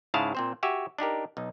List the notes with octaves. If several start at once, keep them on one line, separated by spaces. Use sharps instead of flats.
G#2 C#3 E4 G#4 F5 A5
A#2 C4 C5
F#4 G4 E5 G#5
D4 D#4 G4 A#4
B1 D#4